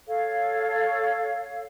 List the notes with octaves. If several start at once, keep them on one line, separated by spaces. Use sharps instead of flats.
A4 C#5 F5